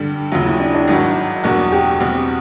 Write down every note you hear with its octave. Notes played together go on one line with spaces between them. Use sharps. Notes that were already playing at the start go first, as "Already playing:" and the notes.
Already playing: G2 D3 G3
D#2 C#3 F#3 F4
E4
D4
D4
G#1 G2 D#3 F#3 F#4
E2 B2 F#3 A#3 D4 F#4
G4
E2 B2 G3 C4